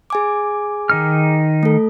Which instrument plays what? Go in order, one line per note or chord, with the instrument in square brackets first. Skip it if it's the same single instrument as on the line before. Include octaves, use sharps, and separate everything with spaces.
[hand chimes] G#4 G#5 D6
[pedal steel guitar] D#3 D#4 F6
[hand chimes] A3 A4